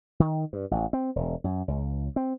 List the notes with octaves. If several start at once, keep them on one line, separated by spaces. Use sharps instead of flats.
D#3
G2
A1
C4
E1
F#2
C#2
C4